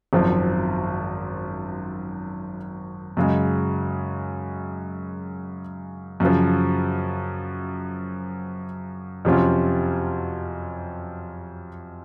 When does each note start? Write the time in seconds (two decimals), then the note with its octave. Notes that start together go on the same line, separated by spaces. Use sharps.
0.13 G#1 F#2 F3 C4
3.17 F#2 C#3 G#3
6.20 F#2 C#3 F3
9.25 F2 C3 F#3 C#4 F4